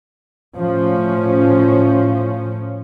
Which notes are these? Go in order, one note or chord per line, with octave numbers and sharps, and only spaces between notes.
A2 F3 C#4